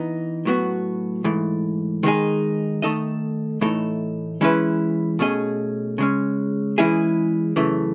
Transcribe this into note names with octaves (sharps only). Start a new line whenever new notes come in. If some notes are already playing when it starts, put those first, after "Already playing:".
Already playing: E3 B3 D#4
A2 F#3 B3 F#4
G#2 E3 A3
D#3 G#3 D#4 G#4
D#3 A3 D#4 A4 D#5
A2 E3 A3 D#4 A4
E3 G#3 C#4 E4 B4
B2 A3 C#4 G#4 D#5
C#3 G#3 C#4
E3 G#3 C#4 E4 G#4
F#2 C#3 E3 A3